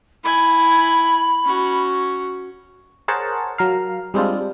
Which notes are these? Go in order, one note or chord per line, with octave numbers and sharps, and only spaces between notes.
E4 G#5 B5
C#4 F#4
G#4 A#4 C5 C#5 F#5 A5
F#3 A#4 F5
G3 G#3 C4 D4 F4